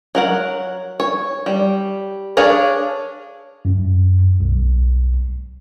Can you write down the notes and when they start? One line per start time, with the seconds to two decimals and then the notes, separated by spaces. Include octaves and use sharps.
0.15 F#3 A#4 F#5
1.00 C#5
1.46 G3
2.37 D4 G#4 C#5 F5
3.65 F#2
4.40 B1